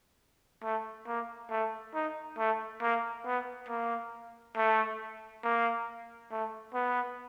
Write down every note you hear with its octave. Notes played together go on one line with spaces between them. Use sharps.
A3
A#3
A3
D#4
A3
A#3
B3
A#3
A3
A#3
A3
B3